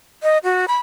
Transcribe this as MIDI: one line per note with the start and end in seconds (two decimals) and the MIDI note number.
0.23 0.38 75
0.44 0.65 66
0.68 0.77 83